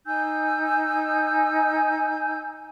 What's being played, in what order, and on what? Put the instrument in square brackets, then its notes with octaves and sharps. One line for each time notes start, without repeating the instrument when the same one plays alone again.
[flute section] D#4 G#5 E6 G6